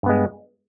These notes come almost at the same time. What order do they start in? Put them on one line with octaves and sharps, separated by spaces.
G2 B3 G#3